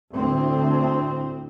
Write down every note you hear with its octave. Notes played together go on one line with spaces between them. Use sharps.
D2 A2 C4